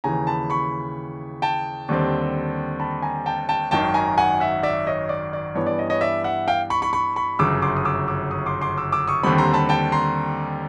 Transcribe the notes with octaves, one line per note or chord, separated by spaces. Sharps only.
D#2 C#3 E3 G#5 A#5
A5 B5
B5 C#6
G5 A5
D#2 D3 G3 C4
A5 B5
G#5 A#5
G5 A5
G5 A5
G#1 F#2 D#3 G5 A5
G#5 A#5
F#5 G#5
E5 F#5
D5 E5
C#5 D#5
D5
D5
G2 E3 G3 B3 C#5
D5
C#5 D#5
C#5 D#5
D5 E5
E5 F#5
F5 G5
B5 C#6
B5 C#6
B5 C#6
B5 C#6
G1 F#2 C#3 D6 E6
C6 D6
D#6
D6 E6
D6 E6
C#6 D#6
C6 D6
C6 D6
D6 E6
D6 E6
C#6 D#6
D#2 D3 G3 C4 B5 C#6
A#5 C6
A5 B5
G5 A5
A#5 C6